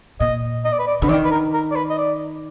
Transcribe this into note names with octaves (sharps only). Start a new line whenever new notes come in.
A#2 D#5
D#5
D5
B4
D5
D3 B4
D#3 D5
B4
A#4
A#4
D5
B4
D#5
D5